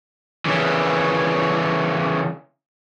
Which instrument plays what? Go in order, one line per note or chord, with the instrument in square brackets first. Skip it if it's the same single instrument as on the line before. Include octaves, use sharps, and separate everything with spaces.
[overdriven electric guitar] C#3 E3